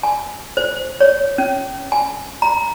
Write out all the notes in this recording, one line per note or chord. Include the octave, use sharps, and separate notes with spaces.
G#5
C5
C#5
C#4
G#5
A#5